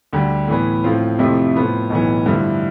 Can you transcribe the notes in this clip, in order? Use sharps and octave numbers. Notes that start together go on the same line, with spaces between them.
D2 D3 G3
A2 E3 B3
A2 F3 C4 F4
F2 C3 F3 A3 E4
A2 F3 B3 F4
B1 A2 E3 B3
G2 D3 F3 A3 E4